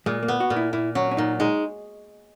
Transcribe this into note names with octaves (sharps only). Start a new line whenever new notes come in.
A#2 G#3
A#3
B3
F#4
A#2
E4
A#2 E4
F#3 C#4
C#4
A#2 D#4
G#3 D#4